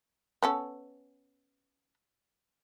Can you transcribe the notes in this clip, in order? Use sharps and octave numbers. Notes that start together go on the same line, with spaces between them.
B3 C#4 A4